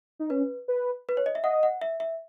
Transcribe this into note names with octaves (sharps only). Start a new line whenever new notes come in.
D#4
C#4 B4
B4
B4
C#5
D#5
E5
D#5 F#5
F#5
E5
E5